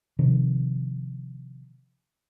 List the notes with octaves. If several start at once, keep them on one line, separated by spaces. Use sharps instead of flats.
C3 D#3 F3